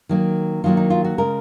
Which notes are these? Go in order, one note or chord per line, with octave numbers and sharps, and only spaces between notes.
D#3 F#3 A#3
D#3 F#3 A#3 F4
D#4
F4
F#4
C#3 G#3 A#4